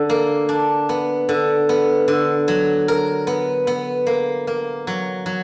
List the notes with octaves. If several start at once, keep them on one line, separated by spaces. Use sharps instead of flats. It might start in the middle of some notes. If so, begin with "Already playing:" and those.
Already playing: D3
A#3
D4
B3
D3
B3
D3
F#3
A#4
B3
B3
A#3
A#3
F#3
F#3